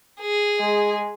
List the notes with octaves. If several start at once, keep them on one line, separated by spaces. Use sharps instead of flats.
G#4
G#3